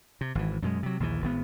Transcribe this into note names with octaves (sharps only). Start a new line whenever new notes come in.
C3
G#1 E3
F#2 B2 G#3
C3 F#3
A#1 D#2 D3 E3
G#1 A2 B3